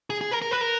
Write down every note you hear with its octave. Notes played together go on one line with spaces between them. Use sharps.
G#4
G#4
A#4
A#4
B4 F#6 A#6 E7
A#4